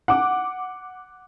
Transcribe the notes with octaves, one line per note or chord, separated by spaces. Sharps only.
F#5 D6